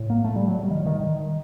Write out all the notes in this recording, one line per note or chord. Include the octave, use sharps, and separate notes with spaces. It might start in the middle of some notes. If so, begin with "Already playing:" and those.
Already playing: A2
A#3
A3
G3
F#3
G3
D#3
D#3
D#3